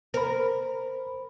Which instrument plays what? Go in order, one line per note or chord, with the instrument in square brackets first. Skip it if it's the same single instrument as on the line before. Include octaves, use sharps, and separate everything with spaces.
[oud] A#4 [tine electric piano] C5 B5